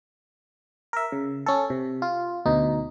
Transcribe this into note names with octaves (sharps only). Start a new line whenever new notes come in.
A#4 E5
C#3
C#4 A4
C3
F4
D2 B2 D#4